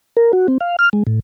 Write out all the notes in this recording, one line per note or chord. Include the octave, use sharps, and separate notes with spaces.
A#4
F#4
C4
F5
F6
G#3
A2